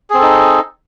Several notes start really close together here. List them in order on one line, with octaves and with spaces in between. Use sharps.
G#4 C4 A4 D#4